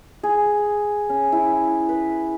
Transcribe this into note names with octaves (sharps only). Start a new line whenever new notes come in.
G#4
C#4
E4
B4